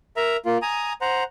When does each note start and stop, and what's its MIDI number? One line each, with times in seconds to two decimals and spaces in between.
0.17 0.37 70
0.17 0.37 76
0.17 0.37 82
0.45 0.58 58
0.45 0.58 65
0.62 0.93 80
0.62 0.93 82
0.62 0.93 87
1.01 1.24 72
1.01 1.24 78
1.01 1.24 82